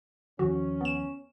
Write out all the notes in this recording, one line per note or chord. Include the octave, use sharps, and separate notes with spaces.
D#2 D#3 F3 C#4 F#4
B3 E7